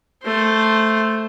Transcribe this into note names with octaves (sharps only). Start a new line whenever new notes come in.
A3 C5